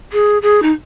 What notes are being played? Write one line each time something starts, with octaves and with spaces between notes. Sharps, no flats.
G#4
G#4
D#4